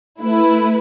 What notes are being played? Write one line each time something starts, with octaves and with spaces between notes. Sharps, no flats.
A3 E4 B4